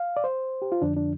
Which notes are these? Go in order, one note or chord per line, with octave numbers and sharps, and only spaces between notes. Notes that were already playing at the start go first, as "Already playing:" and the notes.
Already playing: F5
D5
C5
G4
F4
F2 D3 F3 D4
D4